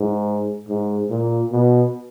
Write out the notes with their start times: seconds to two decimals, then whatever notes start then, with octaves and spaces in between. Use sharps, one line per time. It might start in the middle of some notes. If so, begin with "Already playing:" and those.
Already playing: G#2
0.68 G#2
1.10 A#2
1.52 B2